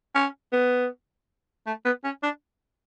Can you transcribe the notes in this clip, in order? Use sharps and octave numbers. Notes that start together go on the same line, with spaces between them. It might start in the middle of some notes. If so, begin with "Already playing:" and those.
C#4
B3
A3
B3
C#4
D4